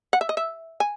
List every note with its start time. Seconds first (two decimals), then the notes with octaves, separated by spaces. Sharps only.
0.13 F#5
0.21 E5
0.29 D#5
0.37 E5
0.80 G#5